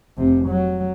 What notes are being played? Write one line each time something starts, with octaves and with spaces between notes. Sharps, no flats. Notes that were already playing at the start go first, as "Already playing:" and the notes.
F1 C3
F#3